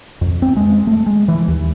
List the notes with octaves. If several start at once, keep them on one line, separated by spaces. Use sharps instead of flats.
F2
C4
G#3
A3
G#3
E3
D#2